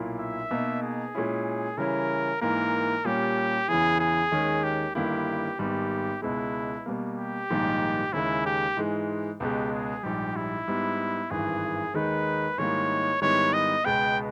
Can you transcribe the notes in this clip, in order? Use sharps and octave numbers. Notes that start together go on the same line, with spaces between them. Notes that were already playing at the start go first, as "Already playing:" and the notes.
Already playing: B1 A#2 A#3 E4
E5
B2 A#3 D#4
G#4
A#2 G#3 C#4 E4
C#3 E3 G3 C#4 E4 A#4
G#2 E3 A#3 A#4
A#2 G3 A#3 C#4 G4
E2 C#3 E3 G#4
G#4
D#2 D#3 G#3 C#4
G4
G1 G2 D#3 A#3 E4 G4
G#1 G#2 G3 B3 G4
C#2 B2 G#3 E4
B2 G3 A#3
G4
A#1 G#2 D#3 G3 A#3
D#2 C#3 G#3 E4
G4
G#2 E3 G#3
C#2 B2 G#3 G4
G#4
A#1 G#2 G3 G4
E4
G#2 G3 B3
G#1 G2 E3 G#4
D#2 D#3 G#3 D#4 B4
G#2 D#3 G3 A#3 E4 C#5
G#2 D#3 G3 B3 E4 C#5
D#5
C#2 B2 G#3 B3 G5